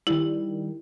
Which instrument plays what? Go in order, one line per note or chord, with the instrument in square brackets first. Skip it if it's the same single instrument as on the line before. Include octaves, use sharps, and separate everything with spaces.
[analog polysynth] D#3 G3 [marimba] E4